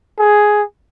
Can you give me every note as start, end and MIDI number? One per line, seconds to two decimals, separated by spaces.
0.19 0.62 68